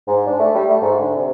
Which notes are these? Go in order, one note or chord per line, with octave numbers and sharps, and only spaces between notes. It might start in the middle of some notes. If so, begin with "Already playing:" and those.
G#2
D4
A3
G3
A3
G#2
D3
C3